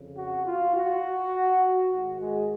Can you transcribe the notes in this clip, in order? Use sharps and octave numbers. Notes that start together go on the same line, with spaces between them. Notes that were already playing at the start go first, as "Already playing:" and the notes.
Already playing: F2 C#3
F#4
F4
F#4
G#2 D#3 F#4
G#3